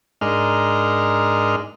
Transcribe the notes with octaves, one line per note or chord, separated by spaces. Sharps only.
G#2 G#3 D4 D#4 A#4 F6